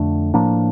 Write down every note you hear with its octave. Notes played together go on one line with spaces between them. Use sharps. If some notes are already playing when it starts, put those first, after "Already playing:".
Already playing: F2 D3 A3 D4
A2 F3 A#3 D4